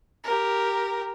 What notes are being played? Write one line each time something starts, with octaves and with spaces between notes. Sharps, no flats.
G4 A#4